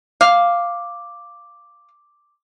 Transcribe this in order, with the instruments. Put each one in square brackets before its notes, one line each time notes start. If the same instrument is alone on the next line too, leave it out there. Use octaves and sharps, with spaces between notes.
[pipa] F5 [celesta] D6